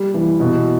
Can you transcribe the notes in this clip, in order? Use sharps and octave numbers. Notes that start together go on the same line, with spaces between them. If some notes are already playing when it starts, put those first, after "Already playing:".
Already playing: G3
E3
B2